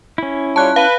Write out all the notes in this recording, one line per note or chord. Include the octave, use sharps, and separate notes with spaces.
C#4 E4
G3 F4 C#5 A5 F#6
B4 F5